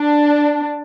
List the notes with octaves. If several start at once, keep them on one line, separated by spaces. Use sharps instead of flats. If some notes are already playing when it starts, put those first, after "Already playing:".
Already playing: D4